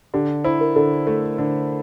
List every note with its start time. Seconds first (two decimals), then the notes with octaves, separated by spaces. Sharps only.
0.14 D3 G4
0.44 E4 C5
0.61 A#4
0.76 D3 A4
1.07 A3
1.38 D3